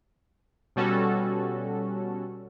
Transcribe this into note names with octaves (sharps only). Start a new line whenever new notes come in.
B2 G3 C#4 F#4 A4